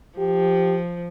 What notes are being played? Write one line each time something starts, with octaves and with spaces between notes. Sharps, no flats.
F3 G4